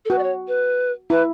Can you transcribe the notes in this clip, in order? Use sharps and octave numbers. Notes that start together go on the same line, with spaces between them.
A4
F#4 B4
D5
C#5
B4
E4 B4